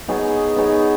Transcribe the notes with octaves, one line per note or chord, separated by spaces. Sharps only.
B3 D#4 G#4 C#5
B3 D#4 G#4 C#5